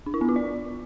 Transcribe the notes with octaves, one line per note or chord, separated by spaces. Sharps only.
D4
E4
B3
F4
D5